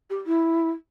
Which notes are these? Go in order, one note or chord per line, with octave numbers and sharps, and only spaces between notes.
G4
E4